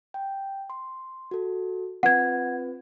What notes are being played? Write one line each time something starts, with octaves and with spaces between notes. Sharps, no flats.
G5
C6
F#4 A4
C4 F4 B4 F#5 G#6